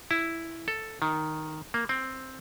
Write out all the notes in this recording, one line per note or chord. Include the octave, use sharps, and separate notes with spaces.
E4
A4
D#3
A#3
C4